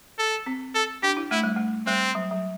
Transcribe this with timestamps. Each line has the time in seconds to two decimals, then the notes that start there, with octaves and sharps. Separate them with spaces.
0.19 A4
0.46 C4
0.75 A4
1.03 D4 G4
1.17 E4
1.31 A3 E4
1.44 G3
1.56 A3
1.87 G3 C4
2.15 F#3
2.31 F#3